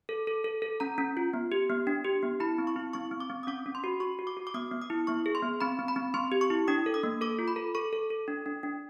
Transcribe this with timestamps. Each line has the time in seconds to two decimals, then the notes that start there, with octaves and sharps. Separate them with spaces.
0.09 A4
0.27 A4
0.44 A4
0.62 A4
0.80 C#4 A#5
0.98 C#4
1.17 F4
1.33 B3
1.52 G4
1.70 B3
1.87 D4
2.04 G4
2.23 B3
2.40 E4 B5
2.58 C4
2.67 C#6
2.76 E4
2.93 C4 C#6
3.11 C4
3.20 D6
3.30 C4
3.43 D#6
3.47 C#4 D6
3.66 C#4
3.75 C6
3.84 F#4
4.00 F#4 C#6
4.19 F#4
4.27 D6
4.37 F#4
4.47 D6
4.54 B3 D#6
4.71 B3
4.82 D#6
4.90 E4
5.07 B3 C#6
5.26 G#4
5.35 C6
5.43 B3
5.61 C4 B5
5.79 C4
5.88 B5
5.96 C4
6.14 C4 C6
6.32 G4
6.41 C#6
6.50 E4
6.68 D4 D#6
6.86 A4
6.94 D#6
7.03 A#3
7.21 A4 D6
7.39 F4
7.48 B5
7.56 A4
7.75 A4 C#6
7.93 A4
8.10 A4
8.28 D4
8.46 D4
8.63 D4